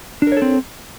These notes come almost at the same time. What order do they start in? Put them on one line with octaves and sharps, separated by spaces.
D4 A#4 C#5 A4 C4